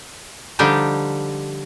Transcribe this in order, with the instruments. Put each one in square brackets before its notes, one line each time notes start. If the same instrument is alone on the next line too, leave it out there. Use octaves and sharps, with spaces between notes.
[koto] D3 F3 G3 D4 D#4 G4